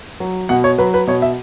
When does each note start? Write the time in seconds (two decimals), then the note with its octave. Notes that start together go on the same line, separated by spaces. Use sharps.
0.20 F#3
0.49 B2 F#5
0.64 C#5
0.78 F#3 B4
0.94 B4
1.07 B2 C#5
1.22 E5